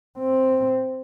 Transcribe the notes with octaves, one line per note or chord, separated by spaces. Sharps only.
C4